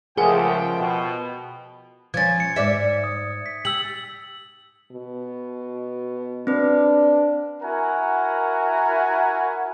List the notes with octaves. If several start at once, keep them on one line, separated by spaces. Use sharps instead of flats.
C#2 F3 A3 F4 G#4 A#4 F#5 G5
B2
F3 C#4 G#6 A6
C#7
G#2 D5 E5
D#6
B6
G4 E6 F#7
B2
C4 D4 B4
E4 F#4 A#4 F#5 G#5 A#5